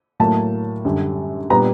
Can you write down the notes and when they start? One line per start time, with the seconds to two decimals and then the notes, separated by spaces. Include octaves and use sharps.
0.20 A2 F#3 A#3 A5
0.85 F#2 D3 G3
1.50 A#2 G3 B3 A#5